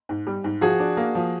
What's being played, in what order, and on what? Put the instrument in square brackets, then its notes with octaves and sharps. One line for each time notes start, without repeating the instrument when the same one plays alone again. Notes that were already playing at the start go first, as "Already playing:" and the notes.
[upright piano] G#2
G3
G#2
[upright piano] F3 [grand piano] F#4 G#4
[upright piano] D4
A#3
F3